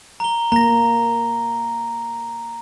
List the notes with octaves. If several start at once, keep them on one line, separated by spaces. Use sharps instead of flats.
A#5 G7
A#3 A#5 A#6